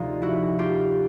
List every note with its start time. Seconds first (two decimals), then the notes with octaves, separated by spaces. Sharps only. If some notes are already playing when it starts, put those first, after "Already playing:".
Already playing: D2 C3 F3 D#4 F4
0.22 E4 F#4
0.59 F4 G4